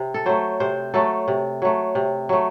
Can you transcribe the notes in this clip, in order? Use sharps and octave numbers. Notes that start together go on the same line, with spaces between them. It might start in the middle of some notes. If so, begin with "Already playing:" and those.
Already playing: C3
A4
F#3 A3 C5
C3 C5
F#3 A3 A4
C3
F#3 A3
C3
F#3 A3